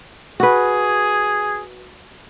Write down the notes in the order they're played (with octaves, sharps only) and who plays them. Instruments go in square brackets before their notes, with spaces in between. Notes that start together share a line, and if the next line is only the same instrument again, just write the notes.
[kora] F#4 B4 [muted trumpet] G#4